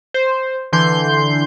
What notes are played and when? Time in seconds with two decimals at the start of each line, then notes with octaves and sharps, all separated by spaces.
0.14 C5
0.72 D3 E3 C6 G6